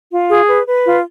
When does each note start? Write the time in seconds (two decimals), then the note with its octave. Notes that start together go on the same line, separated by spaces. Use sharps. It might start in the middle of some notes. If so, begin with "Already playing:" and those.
0.11 F4
0.29 G#4
0.48 B4
0.67 B4
0.85 F4